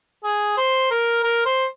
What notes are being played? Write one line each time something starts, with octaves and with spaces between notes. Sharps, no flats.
G#4
C5
A#4
A#4
C5